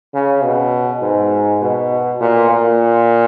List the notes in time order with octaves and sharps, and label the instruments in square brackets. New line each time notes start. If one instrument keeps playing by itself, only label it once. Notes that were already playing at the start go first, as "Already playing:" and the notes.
[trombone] C#3
B2
G#2
B2
A#2
A#2